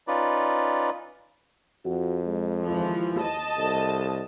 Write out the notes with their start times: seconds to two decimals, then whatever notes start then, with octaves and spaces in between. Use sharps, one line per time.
0.07 C#4 D#4 F4 B4 D5
1.85 F2 F#4
2.25 G#3
2.65 D#2 E3 F3 G#3
3.20 D#5 A5
3.58 C2 A4